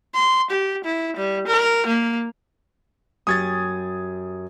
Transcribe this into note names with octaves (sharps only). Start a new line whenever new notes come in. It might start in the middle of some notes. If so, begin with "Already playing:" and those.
C6
G4
E4
G3
A#4
A#3
F#2 G4 C#6 D#6 G#6 A6